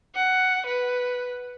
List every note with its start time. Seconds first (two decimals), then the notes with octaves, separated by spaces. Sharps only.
0.15 F#5
0.66 B4